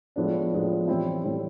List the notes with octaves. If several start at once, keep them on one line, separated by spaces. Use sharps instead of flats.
A2 F3 G#3 B3 D4
A2 F3 G#3 B3 D4
A2 E3 G3 C4 E4
A2 E3 G3 C4 E4